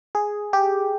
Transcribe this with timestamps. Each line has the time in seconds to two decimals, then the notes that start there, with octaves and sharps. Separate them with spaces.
0.15 G#4
0.53 G4